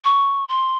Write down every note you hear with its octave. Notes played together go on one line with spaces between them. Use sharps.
C#6
C6